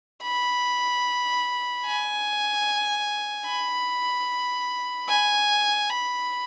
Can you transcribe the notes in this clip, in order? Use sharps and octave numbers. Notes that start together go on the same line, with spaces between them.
B5
G#5
B5
G#5
B5